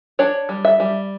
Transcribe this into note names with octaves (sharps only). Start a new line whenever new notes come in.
D4 C#5
G3
E5
G3